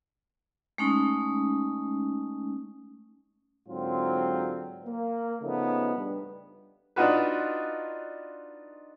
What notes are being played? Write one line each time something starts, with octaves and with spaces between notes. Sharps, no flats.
G#3 A3 C#4 D#4
G#2 D3 F#3 C4 F4
A#3
C#3 F3 A3 B3 D#4
G2
D4 D#4 F4 F#4 B4